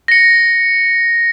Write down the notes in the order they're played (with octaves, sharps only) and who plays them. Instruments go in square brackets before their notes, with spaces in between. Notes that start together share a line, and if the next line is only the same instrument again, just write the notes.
[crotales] A#6 C#7